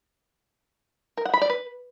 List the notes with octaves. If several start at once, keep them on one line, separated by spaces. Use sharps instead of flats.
A#4
F#5
B5
D5
B4